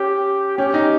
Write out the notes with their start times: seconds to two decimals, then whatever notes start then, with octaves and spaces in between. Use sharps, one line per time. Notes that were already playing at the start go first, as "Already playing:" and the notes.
Already playing: C#4 G4
0.58 C#4 G4
0.74 D#4